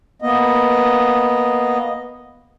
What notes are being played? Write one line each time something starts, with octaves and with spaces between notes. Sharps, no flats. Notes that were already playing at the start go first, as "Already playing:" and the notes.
A#3 B3 D#5